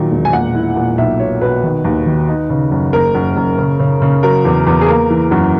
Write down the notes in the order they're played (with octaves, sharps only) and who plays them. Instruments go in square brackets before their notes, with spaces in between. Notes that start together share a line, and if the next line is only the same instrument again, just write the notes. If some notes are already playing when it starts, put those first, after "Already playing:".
Already playing: [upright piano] A#2 D#3 F#3
E1
G#5
A#2 F#5
E4
A#2
B1 E5
B2 C#5
B2 B4
D#3
D#2
D#3
D#4
C#3
F#2
F#1 A#4
F#2
F#2
C#3
C#3
C#3
F#3 A#4
E2
E2
G#4
A#3 A#4
E3
F#2